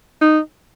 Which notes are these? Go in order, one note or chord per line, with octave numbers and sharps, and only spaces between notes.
D#4